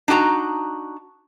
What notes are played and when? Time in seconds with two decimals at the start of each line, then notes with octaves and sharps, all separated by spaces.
0.08 D4 D#4 F#4 A5 A#5